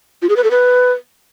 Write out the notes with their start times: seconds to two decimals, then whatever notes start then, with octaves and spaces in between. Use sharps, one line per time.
0.22 F4
0.29 G#4
0.37 B4
0.44 A4
0.51 B4